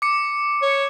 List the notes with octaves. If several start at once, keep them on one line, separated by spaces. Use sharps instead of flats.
D6 C#7
C#5